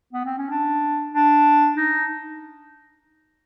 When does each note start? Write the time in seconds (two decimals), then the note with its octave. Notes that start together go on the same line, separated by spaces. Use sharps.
0.13 B3
0.25 C4
0.38 C#4
0.50 D4
1.14 D4
1.77 D#4